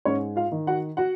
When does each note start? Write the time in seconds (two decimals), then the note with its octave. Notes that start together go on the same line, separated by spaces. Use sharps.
0.05 G#2 C#4 C#5
0.36 F4 F5
0.52 D#3
0.67 F#4 F#5
0.97 F#4 F#5